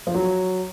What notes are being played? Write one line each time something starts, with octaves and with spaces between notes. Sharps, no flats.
F3
F#3